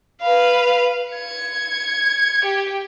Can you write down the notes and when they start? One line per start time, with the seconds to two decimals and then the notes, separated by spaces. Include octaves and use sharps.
0.22 B4 F5
1.14 G#6 C#7
2.45 G4